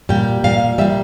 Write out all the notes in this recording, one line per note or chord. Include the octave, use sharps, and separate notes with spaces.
A#2 G3 G5
A#2 G3 F5
A#2 G3 E5